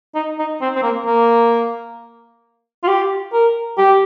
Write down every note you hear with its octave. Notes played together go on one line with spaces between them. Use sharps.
D#4
D#4
C4
C4
A#3
A#3
F4
G4
A#4
G4